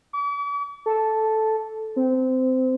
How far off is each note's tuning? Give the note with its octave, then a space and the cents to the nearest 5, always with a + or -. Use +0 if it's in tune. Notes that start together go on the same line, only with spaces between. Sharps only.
D6 -45
A4 -5
C4 -20